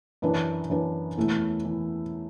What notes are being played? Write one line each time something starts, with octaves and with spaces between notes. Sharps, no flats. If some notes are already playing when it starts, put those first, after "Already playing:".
F#2 E3 D4 B4
F#2 E3 D4 B4
E2 E3 A3 E4
E3